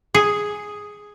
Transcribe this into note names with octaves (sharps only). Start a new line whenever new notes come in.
G#4